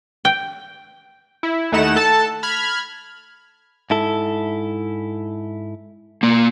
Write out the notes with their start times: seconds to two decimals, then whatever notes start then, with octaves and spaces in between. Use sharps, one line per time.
0.25 G5
1.43 E4
1.72 D#2 A3 D#4 E4 F#5 E7
1.96 A4 A5
2.43 B5 F6 G#6
3.90 G#2 E4 A4
6.23 A#3 D5